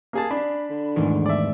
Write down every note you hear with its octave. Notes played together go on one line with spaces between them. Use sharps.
A#3 G#4 A5
D4 B5
D3
E2 G#2 D#3 A3
D5 E5